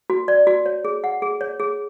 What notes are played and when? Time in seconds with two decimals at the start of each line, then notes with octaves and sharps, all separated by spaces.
0.10 F#4
0.28 D5
0.47 F#4
0.66 C#5
0.85 G#4
1.04 F#5
1.22 G#4
1.41 C#5
1.60 G#4